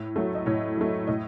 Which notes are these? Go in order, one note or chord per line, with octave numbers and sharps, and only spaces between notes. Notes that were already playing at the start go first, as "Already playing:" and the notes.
Already playing: A2
F#3 A3
D#5
A2 C#5
F#3 A3
A2 D#5